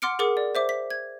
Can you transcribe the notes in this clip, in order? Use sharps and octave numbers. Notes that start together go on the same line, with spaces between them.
F#5 C6 D6 F6 C#7 D7
G#4 A#4 F#5 D6
D5
C5 E5 D6
B6
G#6